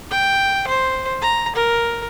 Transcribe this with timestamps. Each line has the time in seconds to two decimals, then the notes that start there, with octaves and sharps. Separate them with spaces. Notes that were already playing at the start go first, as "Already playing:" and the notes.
0.11 G5
0.68 C5
1.22 A#5
1.56 A#4